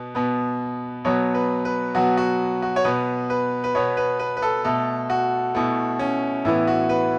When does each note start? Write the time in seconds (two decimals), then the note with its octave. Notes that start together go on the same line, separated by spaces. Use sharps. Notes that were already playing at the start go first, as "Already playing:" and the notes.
Already playing: B2 B3
0.15 B2 B3
1.05 B2 F#3 B3 C#5
1.35 B4
1.65 B4
1.95 B2 F#3 B3 F#4
2.17 F#4
2.62 F#4
2.76 C#5
2.84 B2 B3 B4
3.30 B4
3.64 B4
3.75 B2 B3 C#5
3.97 B4
4.19 B4
4.37 B4
4.42 A4
4.65 B2 A3 A4
5.10 F#4
5.54 B2 A3 E4
5.99 C#4
6.45 A2 E3 B3 E4
6.67 F#4
6.89 B4